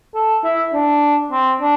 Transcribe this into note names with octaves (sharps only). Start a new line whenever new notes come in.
A4
E4
D4
C4
D4